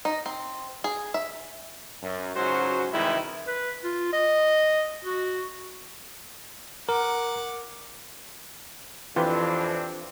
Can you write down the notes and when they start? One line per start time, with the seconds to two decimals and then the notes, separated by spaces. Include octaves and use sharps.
0.05 D#4
0.26 C4
0.84 G#4
1.14 E5
2.03 F#2
2.36 C#2 G#2 F#3 C#4 F#4 C5
2.93 C3 D#3 E3 G3 G#3 E4
3.47 B4
3.84 F4
4.13 D#5
5.05 F#4
6.89 A#4 F#5 D6
9.16 F2 E3 C4 D4 F4 G4 B4